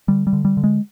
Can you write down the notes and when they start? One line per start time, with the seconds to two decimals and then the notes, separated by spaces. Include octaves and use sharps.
0.08 D3 G3
0.27 G3
0.33 D3
0.45 G3
0.57 D3
0.64 G#3